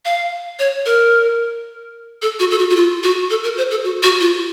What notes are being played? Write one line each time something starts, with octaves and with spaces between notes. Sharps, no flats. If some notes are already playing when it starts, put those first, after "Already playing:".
F5
C#5
A#4
A4
F#4
A4
F#4
F#4
F4
F#4
A4
A#4
C5
A4
F#4
F#4
F4